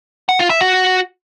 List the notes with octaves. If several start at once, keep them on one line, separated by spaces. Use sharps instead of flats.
F#5
F4
E5
F#4